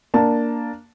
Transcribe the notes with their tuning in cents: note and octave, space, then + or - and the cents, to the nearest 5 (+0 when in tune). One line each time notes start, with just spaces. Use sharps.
A#3 +0 D4 +0 A5 +0